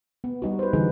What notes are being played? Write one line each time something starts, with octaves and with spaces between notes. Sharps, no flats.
B3
G3 D#4 F#4
B4 C5
D3 E3 G3 D#4 G#4 B4